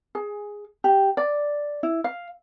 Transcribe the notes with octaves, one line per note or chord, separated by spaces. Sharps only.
G#4
G4
D5
E4
F5